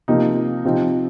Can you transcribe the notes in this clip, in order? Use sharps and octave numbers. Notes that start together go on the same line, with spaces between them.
C3 F3 A#3 D#4
C3 F3 C4 D#4